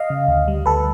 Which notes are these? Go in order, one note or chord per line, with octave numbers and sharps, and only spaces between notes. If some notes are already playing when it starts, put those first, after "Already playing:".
Already playing: D#5 F5
C#3
D2
G3
D2 A4 B4